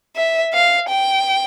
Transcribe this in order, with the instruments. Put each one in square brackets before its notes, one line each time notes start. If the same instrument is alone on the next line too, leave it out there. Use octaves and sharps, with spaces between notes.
[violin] E5
F5
G5